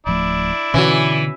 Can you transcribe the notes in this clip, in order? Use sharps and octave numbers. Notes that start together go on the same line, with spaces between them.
D1 F3 A3 D4 E4
B2 D3 E3 C#4 F#4